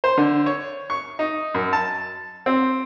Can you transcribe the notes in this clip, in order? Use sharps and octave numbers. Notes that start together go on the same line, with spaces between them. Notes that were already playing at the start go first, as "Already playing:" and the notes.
C5
D3
C#5
C#6
D#4
F#2
A5
C4